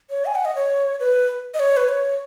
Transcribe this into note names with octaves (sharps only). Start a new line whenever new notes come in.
C#5
G#5
F#5
D#5
C#5
B4
D#5
C#5
B4
C#5